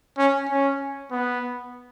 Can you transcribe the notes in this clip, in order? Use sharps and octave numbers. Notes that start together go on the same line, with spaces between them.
C#4
C#4
B3